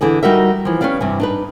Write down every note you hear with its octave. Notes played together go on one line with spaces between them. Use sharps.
D3 E3 G#4 D5
G3 D#4 F#4 A#4 E5
E3 F3
C#4 G4 B4 D5 F5
G2 C3 E3
D4 D#4 B4